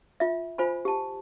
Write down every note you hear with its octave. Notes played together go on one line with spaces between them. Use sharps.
F4 E5
F4 C5 G#5 B5
G4 A5